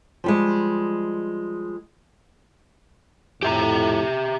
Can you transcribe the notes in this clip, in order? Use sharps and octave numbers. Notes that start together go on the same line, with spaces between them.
F3 G3 G#3
F2 A2 G4 E5 A#5